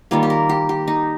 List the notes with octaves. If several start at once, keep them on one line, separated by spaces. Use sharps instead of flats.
D#3 G3 A#3 F4
G4
A#4
G4
G4
D#4